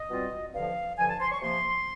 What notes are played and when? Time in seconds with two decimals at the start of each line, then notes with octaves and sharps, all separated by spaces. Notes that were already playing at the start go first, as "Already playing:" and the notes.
Already playing: D#5
0.10 B2 G3 C4 F4
0.53 G2 D3 F3 F5
0.97 G2 D3 F3 G#5
1.08 A5
1.20 C6
1.31 C#6
1.41 C3 F3 A#3 C6